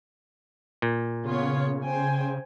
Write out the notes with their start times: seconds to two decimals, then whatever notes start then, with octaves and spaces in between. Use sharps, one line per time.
0.82 A#2
1.24 C#3 B3 F4 C#5
1.83 C5 G5 G#5